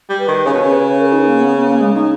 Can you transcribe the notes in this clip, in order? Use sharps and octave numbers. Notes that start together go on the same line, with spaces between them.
G3
B4
D#3
C#3 C#5
B2
C#3
B4
A#4
D#4
A#3
B3
C#4
A#3
G#3
D#4